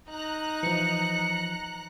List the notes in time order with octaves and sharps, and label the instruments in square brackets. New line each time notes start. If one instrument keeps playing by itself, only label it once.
[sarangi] D#4 [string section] A#5 F#6
[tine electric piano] E3 F3 [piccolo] C#7